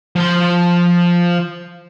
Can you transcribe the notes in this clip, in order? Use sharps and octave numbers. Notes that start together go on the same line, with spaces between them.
F3 C6